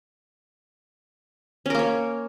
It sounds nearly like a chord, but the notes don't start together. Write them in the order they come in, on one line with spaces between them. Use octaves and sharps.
C#4 A#4 A#3 C#5